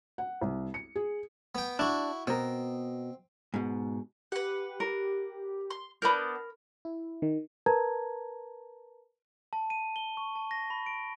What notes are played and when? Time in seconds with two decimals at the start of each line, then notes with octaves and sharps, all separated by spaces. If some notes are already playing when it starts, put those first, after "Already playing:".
0.18 F#5
0.41 C2
0.74 C#7
0.96 G#4
1.55 B3 G5
1.79 D4 E4 F#4
2.27 B2 C4 A#4
3.54 G#2 B2
4.32 G4 B4 F#5
4.80 A#4
5.70 C6
6.02 B3 D4 A#4 B5 G6
6.85 E4
7.22 D#3
7.66 A#4 B4 A5 A#5 G#6
9.53 A5
9.70 D#7
9.96 G7
10.17 C#6
10.35 A5
10.51 A#6
10.70 B5
10.86 D7